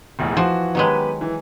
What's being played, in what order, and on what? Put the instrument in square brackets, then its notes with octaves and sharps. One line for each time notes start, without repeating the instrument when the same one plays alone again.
[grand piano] F1 A#1 E2
[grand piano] E3 F#4 [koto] F3
[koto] D#3 F#3 G#3 [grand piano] B3 G4 B4
[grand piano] E3